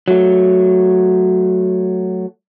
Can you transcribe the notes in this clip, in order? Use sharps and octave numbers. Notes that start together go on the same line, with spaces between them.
F#3 A3